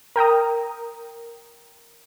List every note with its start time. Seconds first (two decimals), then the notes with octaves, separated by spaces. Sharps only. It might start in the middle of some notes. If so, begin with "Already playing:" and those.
0.16 A#4 G5 A#5 D#6